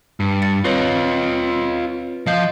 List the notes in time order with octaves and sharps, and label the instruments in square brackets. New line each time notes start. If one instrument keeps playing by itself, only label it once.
[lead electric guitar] G2
[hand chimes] A6 C#7
[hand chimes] C4 B4 C#5 [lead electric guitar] F4 D#5
[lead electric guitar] F3 F5 [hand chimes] D#5 G6